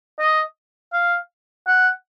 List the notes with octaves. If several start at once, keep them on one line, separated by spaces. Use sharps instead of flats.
D#5
F5
F#5